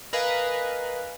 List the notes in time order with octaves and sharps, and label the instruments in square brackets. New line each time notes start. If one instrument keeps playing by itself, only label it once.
[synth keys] A#4 B4 D#5 F5 G#5